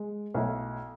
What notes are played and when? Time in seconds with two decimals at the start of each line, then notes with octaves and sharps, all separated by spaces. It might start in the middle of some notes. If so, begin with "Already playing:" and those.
Already playing: G#3
0.34 B1 B2 A3 E4